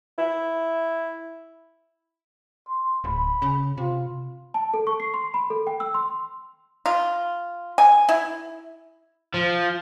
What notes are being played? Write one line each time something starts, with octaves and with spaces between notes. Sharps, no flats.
E4
C6
D1 B5
C#3
C3 F4
A5
A4
C#6
C7
C6
B5
A4
G5
E6
C6
F4
G#5
E4
F3